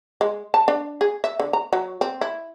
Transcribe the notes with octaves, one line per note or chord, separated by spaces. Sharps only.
G#3
A5
D4
G#4
E5
D3
A#5
F#3
C4
E4